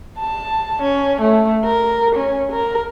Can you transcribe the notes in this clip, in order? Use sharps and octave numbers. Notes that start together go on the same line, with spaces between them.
A5
C#4
A3
A#4
C#4
A#4